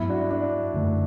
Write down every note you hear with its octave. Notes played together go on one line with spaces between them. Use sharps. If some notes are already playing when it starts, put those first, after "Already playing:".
Already playing: G2 F#3 B3 E4
D4 F#4
D4
F#2 D3 A3